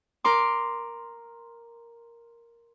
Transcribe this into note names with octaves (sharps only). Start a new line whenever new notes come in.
A#4 C6 D6